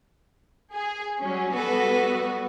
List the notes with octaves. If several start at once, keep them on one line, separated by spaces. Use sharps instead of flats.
G#4
F#3 G3 C#4
G3 B3 F#4 A4 B4